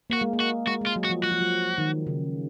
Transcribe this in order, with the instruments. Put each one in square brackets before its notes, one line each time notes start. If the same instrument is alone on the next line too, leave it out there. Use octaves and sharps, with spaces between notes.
[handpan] A#3 [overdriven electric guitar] F#4
[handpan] G#3
A#3
[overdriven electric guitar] F#4
[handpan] G#3 [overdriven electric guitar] F#4
[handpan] G#3
[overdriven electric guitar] F4
[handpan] F#3
[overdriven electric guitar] F#4
[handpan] F3
[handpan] F#3 [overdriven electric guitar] F#4
[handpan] F3
F#3
D#3
C#3